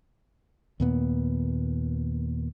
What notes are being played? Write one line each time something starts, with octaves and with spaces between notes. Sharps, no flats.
D#2 A#2 B3